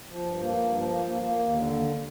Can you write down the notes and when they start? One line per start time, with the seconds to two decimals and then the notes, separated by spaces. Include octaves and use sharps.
0.10 F3
0.26 G2
0.41 A#3
0.58 G2
0.75 F3
0.90 A#3
1.07 A#3
1.23 A#3
1.39 D#2
1.54 D3
1.71 D#2